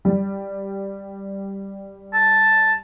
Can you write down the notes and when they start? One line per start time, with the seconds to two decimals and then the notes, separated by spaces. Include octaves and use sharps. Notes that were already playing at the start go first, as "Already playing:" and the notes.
0.05 G3
2.14 A5